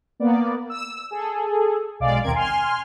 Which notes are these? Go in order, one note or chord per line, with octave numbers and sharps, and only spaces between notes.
A#3 B3 D5
E6
G#4 A4
B1 G#3 D5 F5
D#2 B2 C4 A#4 G#6 D7
G#5 C6 F6